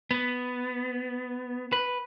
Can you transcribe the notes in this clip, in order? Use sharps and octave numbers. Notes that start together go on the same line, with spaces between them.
B3
B4